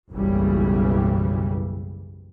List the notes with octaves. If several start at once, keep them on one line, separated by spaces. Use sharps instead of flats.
F#1 B1 G#2 C#3 E3 G3